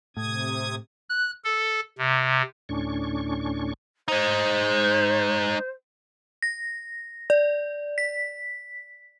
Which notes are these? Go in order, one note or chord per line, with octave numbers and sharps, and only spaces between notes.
A2 C3 D#6 G#6
F#6
A4
C3
D2 A2 C#4 D4 C#6
G#3 D#4 C5
A#6
D5
B6